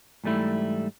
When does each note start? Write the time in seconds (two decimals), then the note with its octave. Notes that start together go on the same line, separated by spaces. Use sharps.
0.24 G#2 E3 G3 A3 E4